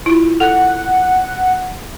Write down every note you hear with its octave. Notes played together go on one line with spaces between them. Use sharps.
E4 F4
A4 F#5